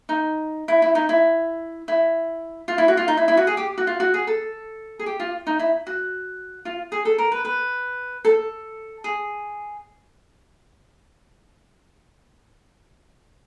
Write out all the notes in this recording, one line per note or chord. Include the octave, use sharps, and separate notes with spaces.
D#4
E4
E4
D#4
E4
E4
F4
E4
F#4
F4
D#4
E4
E4
F#4
G#4
G4
F#4
F4
F#4
G#4
A4
G#4
G4
F4
D#4
E4
F#4
F4
G#4
A4
A#4
B4
B4
A4
G#4